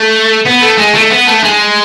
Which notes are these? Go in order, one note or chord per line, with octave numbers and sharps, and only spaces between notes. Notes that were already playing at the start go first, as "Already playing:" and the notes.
Already playing: A3
B3
A3
G#3
A3
B3
A3
G#3